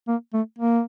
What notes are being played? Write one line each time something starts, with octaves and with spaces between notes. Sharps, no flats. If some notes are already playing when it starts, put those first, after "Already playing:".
A#3
A3
A#3